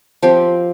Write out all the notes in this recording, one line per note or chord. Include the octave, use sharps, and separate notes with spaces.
F3 C4 G4